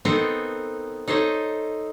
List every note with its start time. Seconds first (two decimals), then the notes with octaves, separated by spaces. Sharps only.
0.05 B3 C4 D#4 A4 A#4 C5
1.08 D#4 A4 C5 C#5 D#5